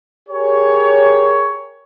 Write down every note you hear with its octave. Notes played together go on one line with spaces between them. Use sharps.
G4 G#4 A#4 C#5